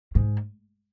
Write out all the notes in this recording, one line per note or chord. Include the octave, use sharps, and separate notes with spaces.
G#2